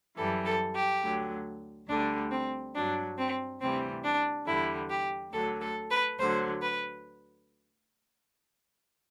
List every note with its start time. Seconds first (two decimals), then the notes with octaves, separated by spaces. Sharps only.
0.17 F#2 E3 G3 A4
0.45 A4
0.74 G4
1.02 D2 D3 F#3
1.88 D2 D3 G3 D4
2.31 C4
2.74 G2 F#3 D4
3.17 C4
3.60 D2 C3 E3 G3 C4
4.04 D4
4.46 E2 D3 G3 E4
4.89 G4
5.32 D2 D3 F#3 A4
5.60 A4
5.90 B4
6.18 D2 D3 F#3 C5
6.61 B4